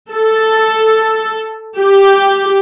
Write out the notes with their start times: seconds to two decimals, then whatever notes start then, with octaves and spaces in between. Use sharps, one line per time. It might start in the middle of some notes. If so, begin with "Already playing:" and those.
0.12 A4
1.78 G4